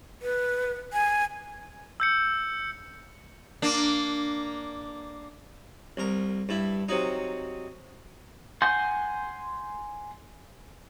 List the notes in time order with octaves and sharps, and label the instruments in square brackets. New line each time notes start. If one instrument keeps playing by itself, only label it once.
[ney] B4
G#5
[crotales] E6 G6 C#7
[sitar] A#3 D4
[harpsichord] C2 A#4
G2 E4
C3 F#3 D#4
[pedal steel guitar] F#5 G#5 C6 G6